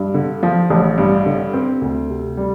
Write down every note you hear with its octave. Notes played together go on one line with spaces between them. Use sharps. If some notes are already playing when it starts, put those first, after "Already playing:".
Already playing: G2
D3
F3
A1
G2
D3
C4
D2
C3
G3